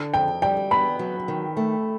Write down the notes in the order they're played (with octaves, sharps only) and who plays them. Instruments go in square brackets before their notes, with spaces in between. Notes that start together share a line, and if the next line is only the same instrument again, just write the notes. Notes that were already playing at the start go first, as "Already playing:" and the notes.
Already playing: [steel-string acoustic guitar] D3
[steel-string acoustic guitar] F2 [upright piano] G5
[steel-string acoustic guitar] G3 [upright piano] G5
[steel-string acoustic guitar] B3 [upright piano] B5
[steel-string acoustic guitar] F#3
D#3
A3